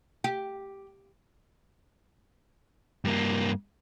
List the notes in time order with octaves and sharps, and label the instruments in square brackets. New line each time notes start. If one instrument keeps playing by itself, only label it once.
[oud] G4
[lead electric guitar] G2 A#3